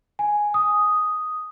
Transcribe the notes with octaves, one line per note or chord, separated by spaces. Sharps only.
G#5
D#6